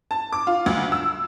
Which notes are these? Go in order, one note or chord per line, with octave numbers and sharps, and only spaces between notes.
A5
D6
F4
D2
E6